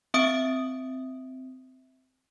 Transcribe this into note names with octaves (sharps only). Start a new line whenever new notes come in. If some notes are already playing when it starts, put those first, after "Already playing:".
C4 E5 D#6 D7